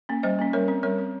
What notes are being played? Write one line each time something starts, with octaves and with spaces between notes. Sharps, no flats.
A#3 C#4
G3 C5 D#5
A#3 C#4
G3 A#4 C#5
C4
G3 A#4 C#5
C4